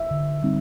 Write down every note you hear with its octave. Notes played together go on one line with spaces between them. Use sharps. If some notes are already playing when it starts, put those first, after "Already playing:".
Already playing: E5
D3
G3 C4 D#4